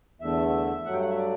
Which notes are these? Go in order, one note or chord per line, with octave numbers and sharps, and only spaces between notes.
E2 D3 A3 E5
G2 F#3 A3 F#5
G5
F#5
E5
D5